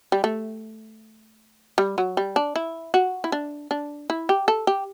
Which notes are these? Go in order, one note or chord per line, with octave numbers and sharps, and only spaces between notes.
G3
A3
G3
F#3
G3
D4
E4
F#4
E4
D4
D4
E4
G4
A4
G4